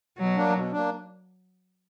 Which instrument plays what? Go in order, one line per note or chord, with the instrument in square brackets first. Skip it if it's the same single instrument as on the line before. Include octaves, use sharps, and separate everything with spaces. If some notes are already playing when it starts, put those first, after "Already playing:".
[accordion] B2 [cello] F#3
[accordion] A#3 D4
B2
A#3 D4